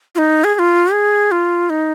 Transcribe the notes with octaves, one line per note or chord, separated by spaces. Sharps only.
F4
D#4
G#4
G#4
F4
G#4
F4
D#4